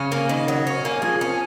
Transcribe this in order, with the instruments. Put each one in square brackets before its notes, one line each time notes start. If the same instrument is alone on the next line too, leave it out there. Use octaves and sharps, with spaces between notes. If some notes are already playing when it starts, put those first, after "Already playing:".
Already playing: [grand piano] C#3 [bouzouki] C#4
[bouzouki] A#3
D#3
F#3
C#4
A#3
[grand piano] F3 [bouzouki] G#4
[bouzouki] C#4